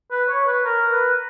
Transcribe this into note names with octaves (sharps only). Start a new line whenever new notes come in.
B4
C#5
B4
A#4
B4